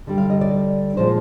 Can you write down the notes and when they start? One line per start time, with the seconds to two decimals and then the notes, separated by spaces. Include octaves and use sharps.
0.07 D3 G3
0.18 F5
0.30 D#5
0.41 D5
0.97 A#2 F3 G#3 C5